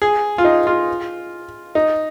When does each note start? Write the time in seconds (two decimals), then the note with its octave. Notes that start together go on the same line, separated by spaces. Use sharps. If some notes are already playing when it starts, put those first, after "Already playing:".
0.02 G#4
0.38 F4
0.45 D#4
0.67 F4
1.75 D#4